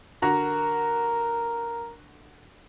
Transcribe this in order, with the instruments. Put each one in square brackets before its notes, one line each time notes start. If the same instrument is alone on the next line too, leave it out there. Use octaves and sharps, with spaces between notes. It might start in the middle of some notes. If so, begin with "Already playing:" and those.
[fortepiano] D3 F#4 A#5 [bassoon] A#4